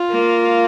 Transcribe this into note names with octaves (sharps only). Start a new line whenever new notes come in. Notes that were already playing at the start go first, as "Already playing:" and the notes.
Already playing: F4
A#3